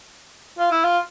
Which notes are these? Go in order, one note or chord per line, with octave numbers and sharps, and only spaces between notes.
F4
E4
F4